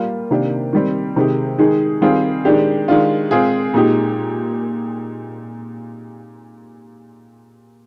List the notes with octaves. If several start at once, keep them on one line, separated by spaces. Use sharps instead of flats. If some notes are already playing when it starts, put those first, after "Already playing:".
Already playing: G3 A#3 F4
C3 D#3 A#3 D4 G4
D#3 G3 C4
C3 D#3 G#3 D#4 G4
D#3 G#3 D#4 G#4
D#3 G3 C4 F4 G#4
D#3 G#3 D4 G4
D#3 G#3 D4 F4
G#3 C4 F4 G#4
A#2 G#3 D#4 G4